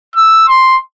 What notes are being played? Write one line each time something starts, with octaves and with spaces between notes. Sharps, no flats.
E6
C6